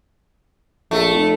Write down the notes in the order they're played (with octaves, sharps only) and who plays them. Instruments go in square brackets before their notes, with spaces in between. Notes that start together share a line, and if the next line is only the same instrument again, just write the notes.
[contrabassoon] A#1 [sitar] A3
[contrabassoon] F1